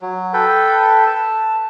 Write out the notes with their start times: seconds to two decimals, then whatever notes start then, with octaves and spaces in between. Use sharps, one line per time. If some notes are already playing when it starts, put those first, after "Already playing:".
0.01 F#3
0.33 A4 B4 G5
1.06 A5